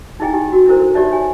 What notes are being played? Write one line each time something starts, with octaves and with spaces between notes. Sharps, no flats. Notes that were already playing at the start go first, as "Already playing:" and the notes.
D#4 E4 G#4 D#5 G5 G#5
D#4 G4
F#4
D4 E4 A4 A#4 C5
D#4 G4 C#5 D5 E5 A5
C#5 G#5